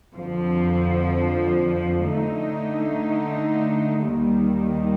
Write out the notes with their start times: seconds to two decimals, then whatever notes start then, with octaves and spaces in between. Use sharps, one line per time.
0.14 F2 D3 F3
2.10 D3 A3 D#4
4.05 D#2 D#3 G3